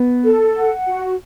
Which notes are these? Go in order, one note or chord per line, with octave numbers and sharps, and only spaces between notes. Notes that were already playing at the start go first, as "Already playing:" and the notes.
Already playing: B3
A4
F#5
F#4